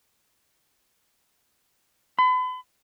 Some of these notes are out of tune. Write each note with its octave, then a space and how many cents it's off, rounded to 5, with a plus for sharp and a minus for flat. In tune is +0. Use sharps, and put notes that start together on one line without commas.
B5 +40